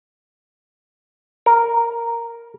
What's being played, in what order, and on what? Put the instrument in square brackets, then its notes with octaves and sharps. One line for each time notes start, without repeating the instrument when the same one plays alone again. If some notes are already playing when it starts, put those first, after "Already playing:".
[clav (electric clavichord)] A#4